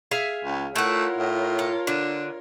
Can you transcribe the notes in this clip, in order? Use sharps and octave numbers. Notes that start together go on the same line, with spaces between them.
G#4 E5 F5
C#2
A3 E4 F4 A#4 C#5 F#5
A2
A4
D3 D4